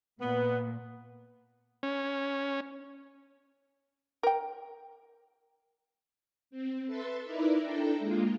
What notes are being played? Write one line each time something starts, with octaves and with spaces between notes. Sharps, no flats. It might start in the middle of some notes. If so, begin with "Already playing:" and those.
A#2 B3
C#4
A#4 G5
C4
A4 B4 E5 C6 A6
D#4 E4 A#4 B4 D5 E5
D4 E4 A4 G5 A#5
G#3 A#3 F4